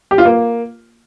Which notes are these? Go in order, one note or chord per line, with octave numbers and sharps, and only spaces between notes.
G4
F4
A#3